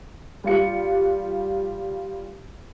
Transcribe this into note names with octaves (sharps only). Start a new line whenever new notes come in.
G3 F4 C#7